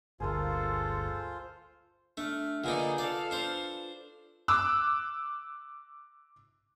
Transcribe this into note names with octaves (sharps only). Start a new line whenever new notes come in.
G1 D2 G#3 A#3 F4 G#4 A4 C5
A3 D4 F6
D3 A#3 D#4 F4 G#4 B4 D5
A4 D5 F5
D4 C5
D6 E6 F#6